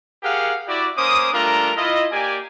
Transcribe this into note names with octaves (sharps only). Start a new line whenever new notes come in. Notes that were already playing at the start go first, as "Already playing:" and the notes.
G4 G#4 A#4 F5 F#5
E4 F#4 G4 D5
A#3 C#4 C5 D6 D#6
G3 A3 D4 F4 A#4 A#5
E4 F4 D#5
A#3 G4 D5 G#5